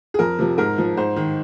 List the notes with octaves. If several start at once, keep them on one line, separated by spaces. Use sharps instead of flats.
G#4
F2 A#4
C3 F3
G#2 A#4
F3
G#2 C5
D#3